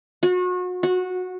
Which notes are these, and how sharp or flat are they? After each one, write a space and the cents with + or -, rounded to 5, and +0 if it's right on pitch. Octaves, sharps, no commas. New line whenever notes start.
F#4 -35
F#4 -15